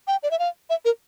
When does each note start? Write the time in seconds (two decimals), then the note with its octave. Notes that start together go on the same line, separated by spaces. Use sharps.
0.07 G5
0.23 D5
0.31 E5
0.39 F5
0.70 E5
0.85 A#4